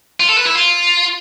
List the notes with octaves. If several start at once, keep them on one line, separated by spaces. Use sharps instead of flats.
F4
A4
B4
E4
F4